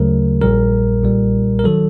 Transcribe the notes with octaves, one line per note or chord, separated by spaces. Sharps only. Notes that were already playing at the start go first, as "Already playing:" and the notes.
Already playing: D2 C#3 F#3 A3 A#4
A#1 A#2 G3 A#4
B1 A#2 G3
A#4
D#3 F#3 A4